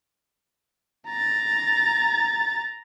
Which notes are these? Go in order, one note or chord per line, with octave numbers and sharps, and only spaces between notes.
A#5 A6